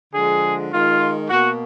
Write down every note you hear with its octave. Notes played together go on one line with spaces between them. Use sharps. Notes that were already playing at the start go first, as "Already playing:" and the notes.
D3 F3 G#3 G#4
D#3 G#3 F4
B2 A#3 F#4